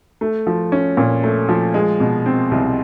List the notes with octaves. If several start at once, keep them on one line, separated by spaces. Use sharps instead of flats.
A3
F3
C#4
A#2
A3
F3
G#3
B2
C4
C2